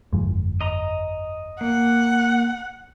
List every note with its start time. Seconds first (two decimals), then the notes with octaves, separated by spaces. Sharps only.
0.13 G1 F2 G#3
0.61 D#5 A#5
1.61 A#3 F#5